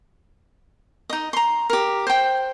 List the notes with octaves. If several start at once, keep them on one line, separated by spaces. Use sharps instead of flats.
D#4 D#5
A#5 C6
G4 A#4
C5 G5